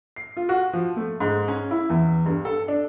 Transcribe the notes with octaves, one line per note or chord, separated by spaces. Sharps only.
C7
F4
F#4
F3
A3
G#2
C#4
E4
E2
G2
A4
D4